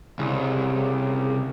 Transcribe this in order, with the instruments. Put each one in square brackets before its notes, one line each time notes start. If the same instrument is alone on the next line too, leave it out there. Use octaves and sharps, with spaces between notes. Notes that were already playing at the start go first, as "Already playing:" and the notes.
[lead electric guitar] C2 [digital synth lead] C#3